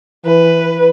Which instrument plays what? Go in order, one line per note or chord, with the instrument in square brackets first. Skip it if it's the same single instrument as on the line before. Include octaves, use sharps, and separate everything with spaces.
[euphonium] E3 [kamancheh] B4